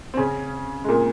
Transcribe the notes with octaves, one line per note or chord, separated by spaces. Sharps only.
C4
C#3 C#4
G#3
A#2 A#3